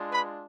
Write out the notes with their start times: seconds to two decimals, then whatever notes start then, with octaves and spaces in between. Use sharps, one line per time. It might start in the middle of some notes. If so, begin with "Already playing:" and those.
Already playing: G#3 D4 F4
0.11 B4 B5